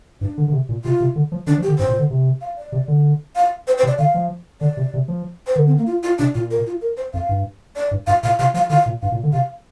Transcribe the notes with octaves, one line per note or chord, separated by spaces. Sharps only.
G2 D4
D3
D3
C3
A#2
C3 F4
C3
D3
F3
D3 D4
F3
G4
D3
G2 C5
A#2
D3
C3
F5
D5
C3
D3
F5
C5
C5
C3
D5
D3 F5
F3
D3 D5
C3
C3
F3
C5
D3 A#4
C4
A#3
F4
F4
C3 D4
A#2 F4
A#4
F4
A#4
C5
F2 F5
G2
D5
G2
G2 F5
A#2 F5
C3 F5
F3 F5
D3 F5
A#2
G2 F5
A#2
D3
C3 F5